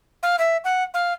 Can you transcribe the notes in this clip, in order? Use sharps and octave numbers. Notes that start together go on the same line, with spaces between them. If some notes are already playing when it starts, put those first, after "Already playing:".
F5
E5
F#5
F5